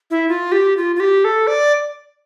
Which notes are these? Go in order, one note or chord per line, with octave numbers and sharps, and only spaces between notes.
E4
F4
G4
F4
F4
G4
A4
D5